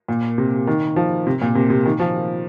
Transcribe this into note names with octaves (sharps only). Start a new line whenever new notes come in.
A#2
C3
D#3
F3
C3
A#2
C3
C3
D#3
F3